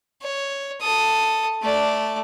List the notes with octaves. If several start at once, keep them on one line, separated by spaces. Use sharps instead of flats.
C#5
A4 D#6
A3 D5